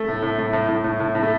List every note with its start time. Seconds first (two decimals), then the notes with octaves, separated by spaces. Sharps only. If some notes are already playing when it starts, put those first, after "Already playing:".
Already playing: A3
0.08 A2
0.22 A2
0.39 A2
0.53 A2
0.69 A2
0.84 A2
1.00 A2
1.15 A2
1.23 A3